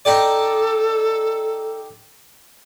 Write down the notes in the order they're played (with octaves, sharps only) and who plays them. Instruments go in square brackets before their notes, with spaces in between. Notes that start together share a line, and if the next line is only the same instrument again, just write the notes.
[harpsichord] D#4 G4 D5 [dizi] A4